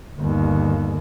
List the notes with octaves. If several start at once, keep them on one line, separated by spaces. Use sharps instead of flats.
G1 D#2